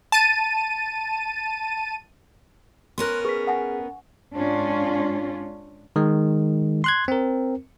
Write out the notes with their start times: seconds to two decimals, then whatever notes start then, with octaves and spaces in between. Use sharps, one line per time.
0.12 A5 D#7
2.98 B3 C#4 A#4 C6 F#6
3.25 G#4 B4 C#6 B6
3.47 F#5 G#5
4.34 G#2 C#4 D4 F4
5.96 D#3 G#3
6.84 C6 F#6 G#6
7.08 C4 A#4